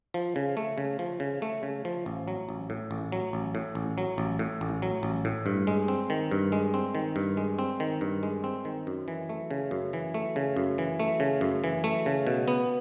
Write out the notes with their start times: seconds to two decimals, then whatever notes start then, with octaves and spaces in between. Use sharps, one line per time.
0.14 F3
0.36 C#3
0.57 A3
0.78 C#3
0.99 F3
1.20 C#3
1.42 A3
1.63 C#3
1.85 F3
2.06 A1
2.28 F#3
2.49 A1
2.70 A2
2.91 A1
3.12 F#3
3.33 A1
3.55 A2
3.75 A1
3.98 F#3
4.18 A1
4.39 A2
4.61 A1
4.82 F#3
5.03 A1
5.25 A2
5.46 G2
5.67 G#3
5.88 C4
6.10 D#3
6.31 G2
6.52 G#3
6.74 C4
6.95 D#3
7.16 G2
7.37 G#3
7.59 C4
7.80 D#3
8.01 G2
8.23 G#3
8.44 C4
8.65 D#3
8.87 F#2
9.08 E3
9.29 A3
9.51 C#3
9.71 F#2
9.93 E3
10.14 A3
10.36 C#3
10.56 F#2
10.78 E3
11.00 A3
11.20 C#3
11.41 F#2
11.64 E3
11.84 A3
12.06 C#3
12.27 B2
12.48 B3